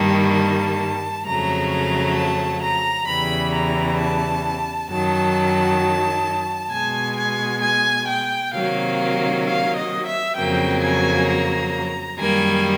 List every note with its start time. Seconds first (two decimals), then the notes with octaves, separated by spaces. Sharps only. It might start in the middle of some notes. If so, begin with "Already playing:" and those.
Already playing: G2 D#3 G3 A#3 A5
0.34 A5
1.25 F2 C#3 F#3 A3 A#5
1.71 A#5
2.17 A5
2.63 A#5
3.07 E2 C#3 E3 G3 B5
3.53 A#5
3.99 A5
4.90 F#2 D#3 F#3 A5
6.72 B2 G#3 G#5
7.17 G#5
7.63 G#5
8.08 G5
8.54 C3 D#3 F#3 A#3 F5
9.46 F5
9.77 D#5
10.06 E5
10.37 F2 C#3 F#3 A#3 G5
10.82 G#5
11.28 A#5
12.19 F#2 D#3 G3 A#3 G#5